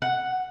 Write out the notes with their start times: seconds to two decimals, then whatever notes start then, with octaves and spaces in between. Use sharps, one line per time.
0.02 F#5